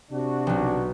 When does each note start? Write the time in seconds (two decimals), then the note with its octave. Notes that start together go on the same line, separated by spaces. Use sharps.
0.11 C3 D4 F#4
0.47 B1 F#3